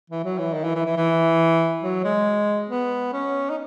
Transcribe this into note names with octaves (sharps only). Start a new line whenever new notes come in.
E3
F#3
E3
D#3
E3
E3
E3
E3
F#3
G#3
B3
C#4
D#4